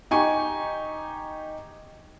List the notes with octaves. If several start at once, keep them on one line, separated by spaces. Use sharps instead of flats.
D#4 G4 G#5 C#6